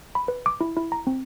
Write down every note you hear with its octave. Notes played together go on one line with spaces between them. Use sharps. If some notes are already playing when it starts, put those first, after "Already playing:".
B5
B4
D6
E4
E4
A#5
C4